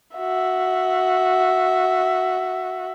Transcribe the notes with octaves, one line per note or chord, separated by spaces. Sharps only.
F#4 E5